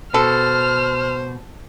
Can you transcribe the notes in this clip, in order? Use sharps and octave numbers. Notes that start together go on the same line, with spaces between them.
B2 A4 C5 F6